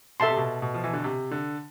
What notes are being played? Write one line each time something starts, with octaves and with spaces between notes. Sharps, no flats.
B2 A4 E5 A5 C6
C3
B2
B2
F3
E3
D3
C3
D3